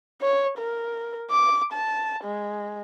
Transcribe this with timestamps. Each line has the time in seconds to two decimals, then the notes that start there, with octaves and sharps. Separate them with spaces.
0.22 C#5
0.58 A#4
1.31 D6
1.73 A5
2.24 G#3